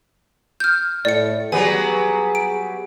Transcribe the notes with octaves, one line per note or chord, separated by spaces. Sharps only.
F6 G6
A2 D5 C#7
F#3 G3 B3 G#4 G#5
D7